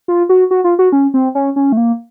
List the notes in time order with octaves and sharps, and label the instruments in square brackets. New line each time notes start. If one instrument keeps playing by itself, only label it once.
[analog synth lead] F4
F#4
F#4
F4
F#4
C#4
C4
C#4
C#4
A3
A#3